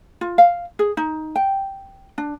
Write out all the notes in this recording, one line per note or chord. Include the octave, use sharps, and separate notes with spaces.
F4
F5
G#4
D#4
G5
D4